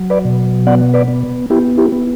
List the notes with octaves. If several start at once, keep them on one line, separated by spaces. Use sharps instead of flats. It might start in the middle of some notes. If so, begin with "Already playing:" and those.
Already playing: F#3
B4 D5
B2
B3 D5 F#5
B4 D5
B3
B3 E4 G4
E4 G4
B3